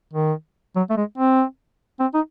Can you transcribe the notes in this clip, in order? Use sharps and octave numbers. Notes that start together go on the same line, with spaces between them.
D#3
F#3
A3
G#3
C4
C4
D#4